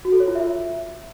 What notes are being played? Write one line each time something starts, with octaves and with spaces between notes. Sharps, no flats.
F#4
A4
C#5
F4
E5